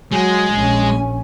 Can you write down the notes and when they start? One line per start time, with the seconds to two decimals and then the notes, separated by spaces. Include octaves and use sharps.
0.12 F#3 G#3 G#5
0.54 A#1 C#4